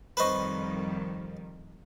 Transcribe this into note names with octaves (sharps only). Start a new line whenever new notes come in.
F2 D#3 G3 B4 C5 D#5 B5 C#6